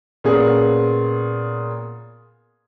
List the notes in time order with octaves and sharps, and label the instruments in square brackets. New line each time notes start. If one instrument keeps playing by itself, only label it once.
[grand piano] A#2 B3 C#4 G#4